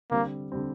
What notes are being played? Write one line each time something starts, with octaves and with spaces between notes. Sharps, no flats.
D3 G3 A#3 C4
D3 G3 C4